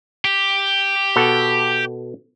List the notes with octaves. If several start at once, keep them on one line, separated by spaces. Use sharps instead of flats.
G4
B2 A4 F#5